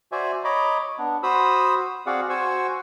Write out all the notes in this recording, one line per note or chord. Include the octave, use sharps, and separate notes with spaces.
F#4 C5 D5 E5 G#5
C#5 D#5 A#5 B5 D6
B3 D4
F#4 C5 B5 D#6 E6
C4 F#4 G#4 D5 F5 F#5
F#4 C5 F#5 G#5 C#6 E6